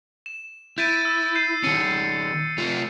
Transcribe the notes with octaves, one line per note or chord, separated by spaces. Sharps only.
E7
E4 G6 A6 D#7
E6 A6
G6 C7 D#7
D#3 C#4 C#7 D#7
A3 F4